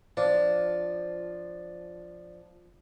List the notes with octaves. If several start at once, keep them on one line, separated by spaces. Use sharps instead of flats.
F3 D4